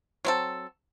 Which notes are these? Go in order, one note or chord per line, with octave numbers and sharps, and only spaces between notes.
F#3 C4 A4